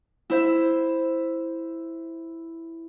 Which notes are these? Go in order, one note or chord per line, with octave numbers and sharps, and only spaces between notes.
E4 C5 E5